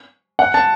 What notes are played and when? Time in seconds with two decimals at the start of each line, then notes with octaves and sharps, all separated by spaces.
0.39 F#5
0.54 A5